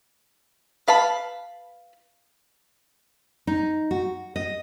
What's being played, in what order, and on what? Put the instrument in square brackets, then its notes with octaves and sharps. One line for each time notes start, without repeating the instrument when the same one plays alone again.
[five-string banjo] B4 F5 A5 B5
[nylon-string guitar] D#4
F#4
D#5